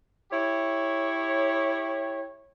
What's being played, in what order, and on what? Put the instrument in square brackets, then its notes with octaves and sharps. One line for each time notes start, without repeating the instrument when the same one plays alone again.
[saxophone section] E4 G4 C#5